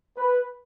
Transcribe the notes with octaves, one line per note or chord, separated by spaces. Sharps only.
B4